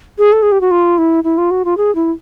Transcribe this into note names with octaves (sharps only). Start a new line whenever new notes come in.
G#4
A4
G#4
G4
F#4
F4
E4
E4
F4
F#4
F4
G#4
E4